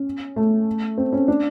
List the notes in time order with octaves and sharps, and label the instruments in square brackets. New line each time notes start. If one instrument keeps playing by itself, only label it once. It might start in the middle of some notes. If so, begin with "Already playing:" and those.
Already playing: [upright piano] C#4
A3
C4
C#4
D4